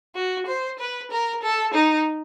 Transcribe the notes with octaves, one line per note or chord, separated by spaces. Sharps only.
F#4
C5
B4
A#4
A4
D#4